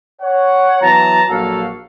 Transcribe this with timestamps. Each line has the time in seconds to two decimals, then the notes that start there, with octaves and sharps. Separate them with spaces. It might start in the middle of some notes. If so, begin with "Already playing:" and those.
0.22 C#5 F#5
0.81 E3 F#3 B3 A5 A#5
1.30 A#1 F#3 A#3 F#4 A4 F5